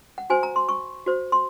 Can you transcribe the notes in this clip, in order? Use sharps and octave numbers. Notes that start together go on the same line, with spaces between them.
F#5
F#4 C5 G#5
A#5
C6
C#6
F#4 C5
C6